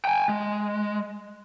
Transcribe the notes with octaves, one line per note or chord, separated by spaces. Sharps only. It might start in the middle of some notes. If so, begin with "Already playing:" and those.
G5 G#5
G#3